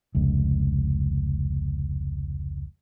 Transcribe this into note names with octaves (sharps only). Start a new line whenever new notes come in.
F1 C#2